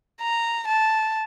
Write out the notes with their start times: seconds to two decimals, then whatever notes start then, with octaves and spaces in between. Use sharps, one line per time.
0.22 A#5
0.67 A5